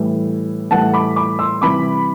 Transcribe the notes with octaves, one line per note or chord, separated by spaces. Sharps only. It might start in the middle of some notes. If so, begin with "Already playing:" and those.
Already playing: A2 E3 G3
A2 E3 G3 F#5 A5
B5 D6
B5 D6
C6 E6
C3 E3 G3 B5 D6